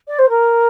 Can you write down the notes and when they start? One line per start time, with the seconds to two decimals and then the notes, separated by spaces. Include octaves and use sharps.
0.07 D5
0.18 C5
0.29 A#4